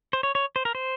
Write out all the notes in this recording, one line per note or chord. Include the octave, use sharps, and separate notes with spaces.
C5
C#5
C#5
C5
A#4
C5